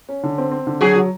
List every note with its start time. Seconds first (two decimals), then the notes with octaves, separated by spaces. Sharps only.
0.09 C#4
0.23 D3
0.38 C4
0.51 C4
0.67 D3
0.81 F#3 F#4 G#4
0.96 F#3